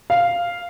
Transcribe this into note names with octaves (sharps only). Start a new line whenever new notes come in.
F5